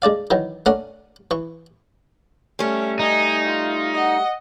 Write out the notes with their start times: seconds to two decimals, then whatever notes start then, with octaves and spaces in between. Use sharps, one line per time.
0.02 G#3 D4 D5 F5
0.31 D#3 E3 F#3
0.66 A3 C#4 D4 A#4 F#5
1.31 E3 C#6
2.59 G3 A3 C#4
2.99 D#4 D#5 G#5
3.46 F4
3.94 D#5 F#5